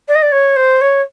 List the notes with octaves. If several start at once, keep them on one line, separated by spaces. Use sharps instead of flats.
D5
D#5
D5
C#5
C5
C#5